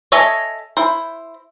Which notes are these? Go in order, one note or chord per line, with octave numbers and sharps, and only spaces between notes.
A4 C#5 D#5 E5 G#5
E4 C5